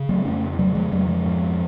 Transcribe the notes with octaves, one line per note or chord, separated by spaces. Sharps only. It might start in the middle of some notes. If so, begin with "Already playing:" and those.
Already playing: C#3
F#3 A3
F2 A3 C#4
C#3 F#3 A3
F3 G#3
F2 F#3 A3
F3 G#3
G#2